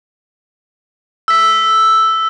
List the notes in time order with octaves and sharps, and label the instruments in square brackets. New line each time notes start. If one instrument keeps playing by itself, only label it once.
[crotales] E6 B6